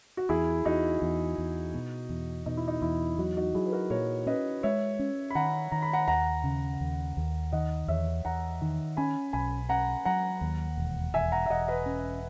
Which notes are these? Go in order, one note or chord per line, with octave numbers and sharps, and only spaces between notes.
F#4
E2 E4 G#4
E2 D#4 F#4
E2
E2
B2
E2
B2 D#4
E4
D#4
E2 E4
F#3 D#4 F#4
D#4 F#4
F#3 E4 G#4
B4
F#4 A#4
A#2 A#4 C#5
C#4 B4 D#5
G#3 C#5 E5
C#4
B5
D#3 F#5 A#5
D#3 A#5
B5
F#5 A#5
D#2 F#5 A#5
C#3
D#2
D#2
D#3 D#5 F#5
E2 C#5 E5
E2 F#5 A#5
D#3
C#4 G#5 B5
B1 G#5 B5
C#4 F#5 A#5
F#3 F#5 A#5
D#2
E1
E1 E5 G#5
F#5 A#5
E5
E1 D#5 F#5
B4 D#5
C#4